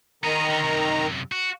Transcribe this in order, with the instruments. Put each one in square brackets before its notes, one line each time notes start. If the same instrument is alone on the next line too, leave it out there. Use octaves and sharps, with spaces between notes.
[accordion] D#3 A#5 [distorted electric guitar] B3 G#4
[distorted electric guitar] D3
F#2 C3
F#4